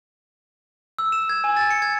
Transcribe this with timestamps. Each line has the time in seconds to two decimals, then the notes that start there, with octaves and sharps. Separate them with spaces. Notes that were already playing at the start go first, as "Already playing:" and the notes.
0.99 E6
1.12 E7
1.29 G#6
1.44 G#5
1.57 A6
1.70 C#7
1.82 G#6